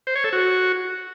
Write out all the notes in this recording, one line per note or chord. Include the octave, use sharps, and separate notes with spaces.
C5
C#5
A4
F#4